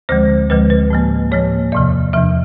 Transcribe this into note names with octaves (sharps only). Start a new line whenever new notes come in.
D2 D3 F3 G#3 C5
D2 D3 F3 G#3 B4
B4
A2 F3 A#3
A2 F3 A#3 C#5
E2 C3 F3 D5
E2 C3 F3 E5